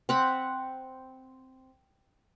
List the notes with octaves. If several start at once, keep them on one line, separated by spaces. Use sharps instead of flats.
C4 F#5 B5